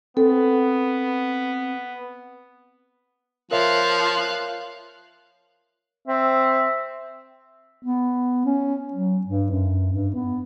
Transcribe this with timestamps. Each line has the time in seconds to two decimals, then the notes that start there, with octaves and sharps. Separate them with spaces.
0.17 B3 C4 A4
3.51 F3 A#4 C#5 E5 F5 F#6
6.08 C4 E5
7.83 B3
8.46 C#4
8.93 F#3
9.27 G2
9.51 F#2
9.93 G2
10.15 B3